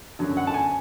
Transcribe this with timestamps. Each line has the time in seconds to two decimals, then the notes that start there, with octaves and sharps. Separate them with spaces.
0.19 F#2 D3 F#3
0.37 F#5
0.47 A5
0.54 G#5